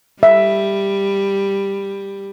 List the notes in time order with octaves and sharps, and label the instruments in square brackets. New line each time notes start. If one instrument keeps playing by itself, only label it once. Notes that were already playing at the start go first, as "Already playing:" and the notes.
[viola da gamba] G3 [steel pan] E5